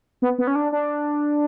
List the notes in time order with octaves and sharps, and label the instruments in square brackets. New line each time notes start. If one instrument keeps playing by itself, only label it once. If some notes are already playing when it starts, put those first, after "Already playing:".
[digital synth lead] B3
B3
C#4
D4
D4